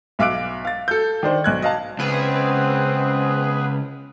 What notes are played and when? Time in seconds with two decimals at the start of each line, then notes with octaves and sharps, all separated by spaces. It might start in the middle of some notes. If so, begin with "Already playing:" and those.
0.19 B1 E5 F5 D6 F#6 D7
0.65 F5 A6
0.88 A4 G6
1.23 D#3 D4 C5
1.44 B1 F#6 G#6
1.62 D#5 F5 A5
1.99 C#2 B3 C4 G#4 B4